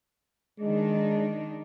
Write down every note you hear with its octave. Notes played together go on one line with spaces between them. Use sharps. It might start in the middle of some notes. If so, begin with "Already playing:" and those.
D#3 G#3 D4 D#4